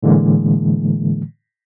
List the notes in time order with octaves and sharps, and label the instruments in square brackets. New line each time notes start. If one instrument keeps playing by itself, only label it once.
[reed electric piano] A2 D3 E3 G#3 A#3